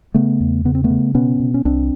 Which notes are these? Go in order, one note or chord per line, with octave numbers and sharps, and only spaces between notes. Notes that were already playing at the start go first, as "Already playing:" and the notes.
C#3 A3 B3
E2
C#3 B3
C4
A3 B3
C#3
B2 B3 C#4
B2
C#4
C2 C4 D4